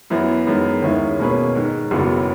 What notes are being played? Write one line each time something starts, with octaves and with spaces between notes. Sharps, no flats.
F#2 E3 B3 E4
F#2 D#3 G#3 B3
D#2 D#3 G#3 C#4 E4
B2 A#3 C#4 G#4 B4
G#2 D#3 G#3
F#1 E2 C#3 F#3 B3